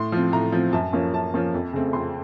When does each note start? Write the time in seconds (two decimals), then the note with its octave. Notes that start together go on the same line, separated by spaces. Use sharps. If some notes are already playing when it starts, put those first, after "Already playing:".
Already playing: A2 C6
0.12 F3 C4
0.32 A2 A#5
0.52 F3 C4
0.73 F#2 A5
0.93 F3 A#3 C#4
1.13 F#2 A5
1.34 F3 A#3 C#4
1.54 F2
1.73 C#3 A3 C4
1.93 F2 C6